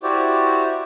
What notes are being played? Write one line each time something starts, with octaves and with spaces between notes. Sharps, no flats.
E4 F#4 G4 C5 D5